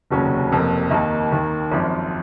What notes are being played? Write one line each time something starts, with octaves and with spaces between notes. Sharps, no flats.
F1 D#2 C#3 F#3 C#4
F1 F2 F3 A#3
D#2 D#3 A#3 D#4
D#2 D#3 A#3
G#1 F#2 F3